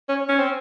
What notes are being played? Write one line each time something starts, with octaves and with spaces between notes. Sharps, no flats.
C#4
C#4
C4